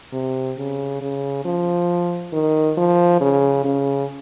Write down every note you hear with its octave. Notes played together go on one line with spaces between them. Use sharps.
C3
C#3
C#3
F3
D#3
F3
C#3
C#3